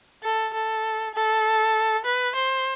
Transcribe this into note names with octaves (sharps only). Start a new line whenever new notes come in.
A4
A4
A4
B4
C5